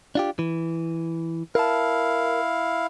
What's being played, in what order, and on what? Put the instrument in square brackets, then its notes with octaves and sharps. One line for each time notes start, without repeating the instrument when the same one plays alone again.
[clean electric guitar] D4 F4 G4
E3
[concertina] E4 F5 [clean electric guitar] A#4 A5